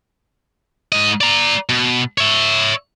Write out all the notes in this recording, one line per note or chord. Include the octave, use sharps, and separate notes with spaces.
G#2 D#5
D5 A#5
B2
C#5 E5